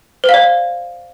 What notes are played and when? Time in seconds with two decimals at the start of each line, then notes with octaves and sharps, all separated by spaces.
0.24 C5
0.29 F5
0.34 D5